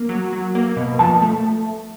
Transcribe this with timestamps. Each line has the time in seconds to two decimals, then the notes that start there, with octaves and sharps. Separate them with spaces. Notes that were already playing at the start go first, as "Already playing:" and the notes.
Already playing: A#3
0.09 F#3
0.33 F#3
0.55 A#3
0.77 B2
0.99 F3 A5
1.22 A3